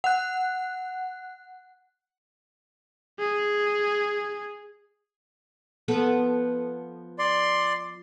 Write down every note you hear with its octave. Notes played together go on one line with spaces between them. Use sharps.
F#5 F#6
G#4
F3 B3 A4
D5 C6